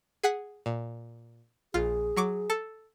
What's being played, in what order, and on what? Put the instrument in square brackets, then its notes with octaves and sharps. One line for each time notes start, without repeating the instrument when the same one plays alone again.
[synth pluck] G#4 F#5 B6
A#2
[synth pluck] A#1 F4 F6 [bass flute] G#4
[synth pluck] F#3 C#6 D6
A4